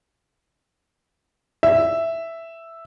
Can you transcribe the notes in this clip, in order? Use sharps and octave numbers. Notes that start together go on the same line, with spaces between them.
E5